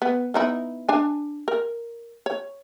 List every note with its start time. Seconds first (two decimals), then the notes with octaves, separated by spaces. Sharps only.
0.02 B3
0.34 B3 D#4 E4
0.89 D4 G#5
1.48 A#4
2.26 C#5